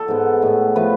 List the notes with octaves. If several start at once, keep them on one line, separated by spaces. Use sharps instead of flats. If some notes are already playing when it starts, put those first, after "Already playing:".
Already playing: A4
G#2 G#3 B3
A2 G#3 B3
F3 A3 B4